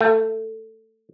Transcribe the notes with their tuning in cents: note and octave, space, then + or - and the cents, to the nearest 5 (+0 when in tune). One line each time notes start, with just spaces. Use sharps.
A3 +15